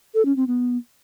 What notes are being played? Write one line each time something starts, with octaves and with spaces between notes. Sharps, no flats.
A4
C#4
C4
B3